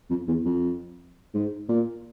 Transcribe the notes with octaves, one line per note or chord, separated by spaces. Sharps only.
F2
E2
F2
G#2
A#2